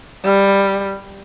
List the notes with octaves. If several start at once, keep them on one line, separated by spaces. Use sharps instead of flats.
G3